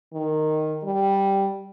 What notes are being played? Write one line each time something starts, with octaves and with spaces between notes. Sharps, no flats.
D#3
G3